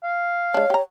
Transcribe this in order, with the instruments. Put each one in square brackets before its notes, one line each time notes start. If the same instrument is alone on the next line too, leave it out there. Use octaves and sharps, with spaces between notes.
[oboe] F5
[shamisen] G#3 D4 [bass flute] C#5
[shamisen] G4 A#5